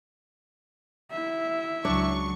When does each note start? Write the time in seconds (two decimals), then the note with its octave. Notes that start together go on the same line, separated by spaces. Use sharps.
1.12 E4 E5
1.85 C#2 F#3 D4 C#6